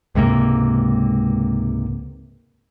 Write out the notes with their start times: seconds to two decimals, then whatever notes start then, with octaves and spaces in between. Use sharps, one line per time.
0.15 C#2 G#2 C3 A#3